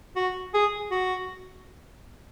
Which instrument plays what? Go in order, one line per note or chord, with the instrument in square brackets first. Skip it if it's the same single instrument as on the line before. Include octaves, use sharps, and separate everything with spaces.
[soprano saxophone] F#4
G#4
F#4